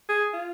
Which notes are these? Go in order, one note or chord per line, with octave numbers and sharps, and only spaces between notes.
G#4
F4